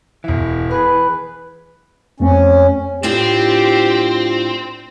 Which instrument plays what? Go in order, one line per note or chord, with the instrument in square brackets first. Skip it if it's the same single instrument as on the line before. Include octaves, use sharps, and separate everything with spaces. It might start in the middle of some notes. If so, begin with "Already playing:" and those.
[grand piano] E1 E5 [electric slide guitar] E3
[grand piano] G#4 [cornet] B4
[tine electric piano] F2 A3 C4 [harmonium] C#4
[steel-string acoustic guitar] A2 D4 F4 [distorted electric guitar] C4 [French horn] G4